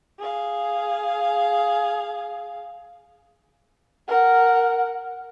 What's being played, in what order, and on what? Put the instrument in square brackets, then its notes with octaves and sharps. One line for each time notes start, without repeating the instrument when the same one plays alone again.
[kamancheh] G#4 F5
A#4 F#5